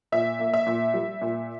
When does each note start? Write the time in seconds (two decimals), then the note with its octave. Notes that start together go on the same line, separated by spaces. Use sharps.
0.12 A#2 E5
0.39 A#3
0.54 E5
0.67 A#2
0.94 G3
1.22 A#2